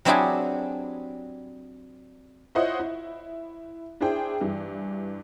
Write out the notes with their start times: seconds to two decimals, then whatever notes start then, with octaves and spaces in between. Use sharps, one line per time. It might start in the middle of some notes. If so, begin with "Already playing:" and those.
0.05 F#3 C4 D4 E4 G4 G#4
2.55 E4 F4 C5 C#5 D#5 F#5
2.80 E4
4.00 D4 E4 G#4 C5 G5
4.41 G2 E3